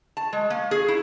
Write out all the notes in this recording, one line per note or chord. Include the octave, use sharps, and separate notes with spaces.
A5
G#3
A#3
G#4
E4